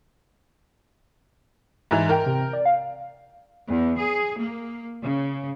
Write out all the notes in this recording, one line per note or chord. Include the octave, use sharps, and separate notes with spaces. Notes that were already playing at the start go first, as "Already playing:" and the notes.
G#2 E3 F7
A#4 G5
C3
D5
F5
E2
G#4
A#3
C#3